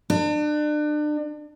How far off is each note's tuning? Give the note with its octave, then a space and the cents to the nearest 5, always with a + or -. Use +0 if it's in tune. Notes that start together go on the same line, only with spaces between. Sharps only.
D4 +35